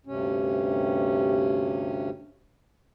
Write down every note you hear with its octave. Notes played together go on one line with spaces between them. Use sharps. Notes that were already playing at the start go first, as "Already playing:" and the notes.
D2 G2 C3 C#4